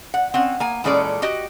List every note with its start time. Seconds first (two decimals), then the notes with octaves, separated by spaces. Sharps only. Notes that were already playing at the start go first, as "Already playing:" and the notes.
0.14 F#5
0.34 C4 C#4 F#5
0.60 A#3 G#5
0.84 A#2 E3 G#3 C#4 A4 D5
1.22 F#4 G4 D#5